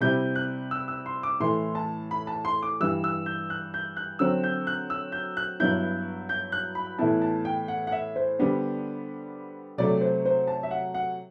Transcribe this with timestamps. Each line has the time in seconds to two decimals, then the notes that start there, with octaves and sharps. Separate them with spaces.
0.01 C3 G3 C4 E4 G6
0.36 F#6
0.71 E6
0.88 E6
1.06 C6
1.23 D6
1.40 A2 E3 A3 C6
1.75 A5
2.11 B5
2.27 A5
2.45 C6
2.62 D6
2.80 G2 E3 G3 E6
3.04 E6
3.26 G6
3.50 F#6
3.74 G6
3.97 F#6
4.19 D3 F#3 C4 E6
4.43 G6
4.67 F#6
4.90 E6
5.12 G6
5.37 F#6
5.60 G2 F#3 B3 E4 G6
6.29 G6
6.52 F#6
6.75 B5
6.98 A2 E3 B3 E4 A5
7.22 A5
7.45 G5
7.68 F#5
7.87 F#5
7.92 E5
8.16 C5
8.39 D3 G3 B3 D4
9.78 C3 F#3 A3 D5
10.01 C5
10.25 C5
10.48 A5
10.63 E5
10.71 F#5
10.94 F#5